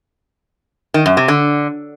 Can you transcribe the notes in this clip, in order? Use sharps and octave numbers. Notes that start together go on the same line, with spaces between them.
D#3
F#2
C3
D3